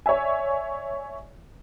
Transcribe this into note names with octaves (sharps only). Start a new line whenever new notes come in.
C#5 D5 E5 G#5